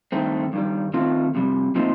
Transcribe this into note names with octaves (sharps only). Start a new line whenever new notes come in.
G2 D#3 A3 C4
G2 D#3 G3
D#3 A3 C4 F4
F2 C3 G3
A#2 F3 A3 C4 D#4